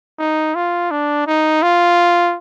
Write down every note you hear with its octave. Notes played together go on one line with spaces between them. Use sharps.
D#4
F4
D4
D#4
F4